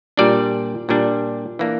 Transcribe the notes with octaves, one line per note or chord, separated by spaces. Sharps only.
A#2 G3 D4 D5
A#2 G3 D4
E3 A#3 D4